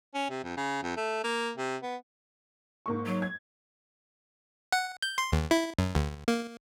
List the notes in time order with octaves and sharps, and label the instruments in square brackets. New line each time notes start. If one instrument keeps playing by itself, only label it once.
[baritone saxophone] C#4
C3
F2
C#3
F2
A3
A#3
C3
B3
[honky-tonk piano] G#2 A#3 C#6
[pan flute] F#3
[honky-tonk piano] G#6
[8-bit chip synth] F#5
G6
C6
D#2
E4
F#2
D2
A#3